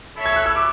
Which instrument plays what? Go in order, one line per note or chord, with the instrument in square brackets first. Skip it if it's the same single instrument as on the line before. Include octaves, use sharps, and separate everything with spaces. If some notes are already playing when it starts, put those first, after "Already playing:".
[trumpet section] E4 A4 C#5 E5
[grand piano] G#6
F#6
E6
D6